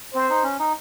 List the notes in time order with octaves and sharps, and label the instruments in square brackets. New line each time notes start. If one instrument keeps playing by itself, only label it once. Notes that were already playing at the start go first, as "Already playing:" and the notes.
[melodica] C4 [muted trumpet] C5
[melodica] D#4
C#4
D#4